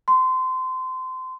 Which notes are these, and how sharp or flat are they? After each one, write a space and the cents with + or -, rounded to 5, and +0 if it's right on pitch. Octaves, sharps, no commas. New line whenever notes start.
C6 -25